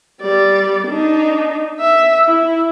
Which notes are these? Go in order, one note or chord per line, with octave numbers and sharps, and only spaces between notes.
G3 D5
D4 D#4
E5
E4